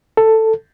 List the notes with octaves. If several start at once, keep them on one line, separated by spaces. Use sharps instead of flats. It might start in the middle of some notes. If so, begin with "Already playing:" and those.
A4